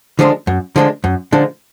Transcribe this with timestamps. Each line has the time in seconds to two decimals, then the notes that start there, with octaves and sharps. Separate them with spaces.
0.19 D3 F3 G#3 D4
0.47 F#2
0.76 D3 F3 G#3 D4
1.04 F#2
1.32 D3 F3 G#3 D4